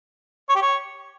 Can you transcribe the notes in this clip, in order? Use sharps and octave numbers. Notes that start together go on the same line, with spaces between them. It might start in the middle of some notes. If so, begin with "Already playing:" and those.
C#5
G4
C#5